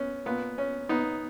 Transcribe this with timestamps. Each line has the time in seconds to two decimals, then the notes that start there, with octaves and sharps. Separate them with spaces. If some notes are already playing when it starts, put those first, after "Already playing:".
Already playing: B3 C#4
0.26 A#2 B3
0.58 C#4
0.89 B3 D#4